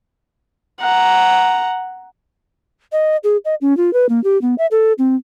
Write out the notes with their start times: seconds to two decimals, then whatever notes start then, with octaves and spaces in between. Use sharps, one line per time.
0.80 F#5 A#5
2.92 D#5
3.24 G#4
3.45 D#5
3.61 C#4
3.77 F4
3.93 B4
4.09 A#3
4.24 G4
4.41 B3
4.58 E5
4.71 A4
4.98 C4